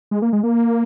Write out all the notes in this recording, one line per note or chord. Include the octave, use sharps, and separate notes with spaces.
G#3
A#3
G#3
A#3